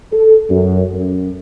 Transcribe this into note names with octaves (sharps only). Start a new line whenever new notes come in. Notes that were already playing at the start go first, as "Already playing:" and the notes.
A4
F#2
F#2